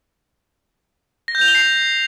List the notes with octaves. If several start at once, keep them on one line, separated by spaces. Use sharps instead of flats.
A#6
G6
F7
G7
C7